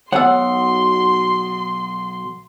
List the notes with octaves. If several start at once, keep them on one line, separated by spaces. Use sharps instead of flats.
B1 B2 C#5 F#5 C6 E6